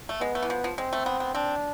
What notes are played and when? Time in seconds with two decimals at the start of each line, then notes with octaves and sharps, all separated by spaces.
0.09 A3
0.21 G#3 B3
0.35 A3
0.43 E3
0.50 F3
0.64 F3
0.78 G#3 C4
0.93 A3
1.06 B3
1.20 B3
1.34 C4 D4